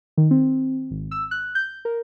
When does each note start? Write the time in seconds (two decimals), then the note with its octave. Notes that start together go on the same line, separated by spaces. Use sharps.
0.17 D#3
0.31 C4
0.91 G#1
1.11 E6
1.31 F#6
1.55 G6
1.85 A#4